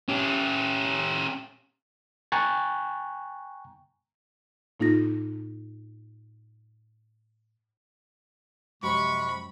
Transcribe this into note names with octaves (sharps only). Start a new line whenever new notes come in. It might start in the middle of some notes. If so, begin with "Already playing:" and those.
C#4 G4
G5 G#5 A#5 C#6 F#6 A6
A2 A#3 D#4 F4 A#6
F#2 C3 F3 F#3 G#3 G4 B5 C#6